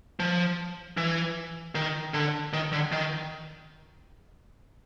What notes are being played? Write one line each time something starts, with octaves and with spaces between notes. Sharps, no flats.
F3
E3
D#3
D3
D#3
D3
D#3